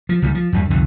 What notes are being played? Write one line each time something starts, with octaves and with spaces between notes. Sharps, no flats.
F3
C#2 D#3 G3
F3
E2 G2 G3
C2 F2 D3 D#3